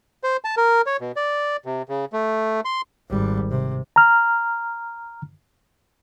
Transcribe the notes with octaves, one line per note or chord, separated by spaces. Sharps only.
C5
A5
A#4
C#5
B2
D5
C3
C#3
A3
C6
G#1 G3
C3
A#5 F6